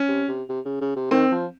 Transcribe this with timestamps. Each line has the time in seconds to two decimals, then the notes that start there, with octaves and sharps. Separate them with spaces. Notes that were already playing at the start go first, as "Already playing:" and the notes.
Already playing: C#4
0.08 C3
0.28 C3
0.49 C3
0.65 C#3
0.81 C#3
0.96 C3
1.11 D#3 C4
1.32 F3